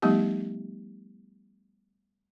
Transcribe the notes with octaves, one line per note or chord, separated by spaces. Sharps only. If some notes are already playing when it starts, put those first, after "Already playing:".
F3 G3 A3 B3 D#4 G4